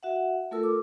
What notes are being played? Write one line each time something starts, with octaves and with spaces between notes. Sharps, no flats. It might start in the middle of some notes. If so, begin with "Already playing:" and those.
F#4 E5 F#5
A3 F4 A4 A#4 E6
D6